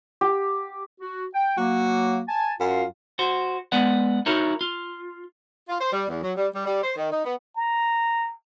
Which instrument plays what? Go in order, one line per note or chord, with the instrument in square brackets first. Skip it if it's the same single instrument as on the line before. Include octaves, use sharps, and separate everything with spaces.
[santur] G4
[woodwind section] F#4
G5
[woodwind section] F#3 A#3 [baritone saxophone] F#4
[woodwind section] G#5 A5
[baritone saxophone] F#2 [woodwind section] F4 F5
[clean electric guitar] F#4 C5
G#3 B3 B4 D5 F#5
D#4 E4 F#4 A#4 C#5
F4
[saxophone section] F4
C5
G3
E2
F#3
G3
G3
G3
C5
D#3
D#4
B3
[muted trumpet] A#5